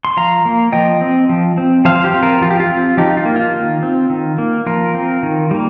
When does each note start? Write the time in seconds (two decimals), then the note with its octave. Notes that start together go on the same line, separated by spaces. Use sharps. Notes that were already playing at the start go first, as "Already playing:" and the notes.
0.05 C6
0.17 F3 F5 A#5
0.45 A#3
0.72 F3 D#5 G5
1.01 C4
1.29 F3
1.58 C4
1.85 F3 C5 F5
2.04 G4 C5
2.14 C4
2.23 F4 A#4
2.41 F3 F4
2.51 G4
2.60 F4
2.70 C4
2.97 F3 D#4 G4
3.17 F4
3.25 A#3
3.36 F4
3.54 D#3
3.83 C4
4.10 D#3
4.38 A#3
4.66 F3 F4 A#4
4.95 C4
5.23 D#3
5.51 G3 A#3